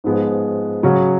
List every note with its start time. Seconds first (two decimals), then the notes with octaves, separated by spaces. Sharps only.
0.04 G#2 F3 G#3 B3
0.83 C#3 F#3 C#4 F#4 C#5